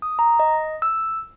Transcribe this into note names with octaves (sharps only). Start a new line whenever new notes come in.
D#6
A#5
D#5
E6